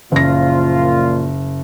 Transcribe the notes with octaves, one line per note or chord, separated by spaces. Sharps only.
F#1 A#2 F3 F4 A#6